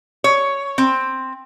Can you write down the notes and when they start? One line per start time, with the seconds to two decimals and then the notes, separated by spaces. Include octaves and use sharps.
0.24 C#5
0.78 C4